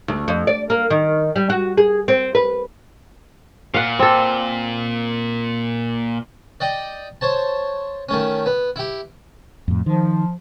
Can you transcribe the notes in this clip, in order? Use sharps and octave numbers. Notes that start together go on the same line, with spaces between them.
D2
F2
D5
A#3
D#3
G3
F#4
G#4
C4
B4
A#2 F5 F#5
C4 A4
D5 D#5 G5
C5 C#5 A5
D#3 A3 C#4
B3
E4 G4
F2 A2
D#3 F3